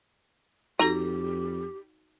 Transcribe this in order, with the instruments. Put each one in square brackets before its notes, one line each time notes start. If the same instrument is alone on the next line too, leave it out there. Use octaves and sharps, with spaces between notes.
[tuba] F2 [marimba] D#4 F#4 A4 [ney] G4 [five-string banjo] A#5